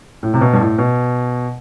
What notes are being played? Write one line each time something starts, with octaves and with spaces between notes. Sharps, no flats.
A2
C3
B2
G2
A2
B2